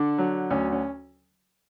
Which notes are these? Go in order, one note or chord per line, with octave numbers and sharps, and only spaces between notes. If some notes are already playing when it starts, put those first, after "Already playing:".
Already playing: D3 D4
F#3
D2 C#4
C#4